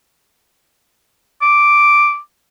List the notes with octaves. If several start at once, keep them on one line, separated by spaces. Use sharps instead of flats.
D6